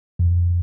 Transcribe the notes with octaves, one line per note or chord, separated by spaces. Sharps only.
F2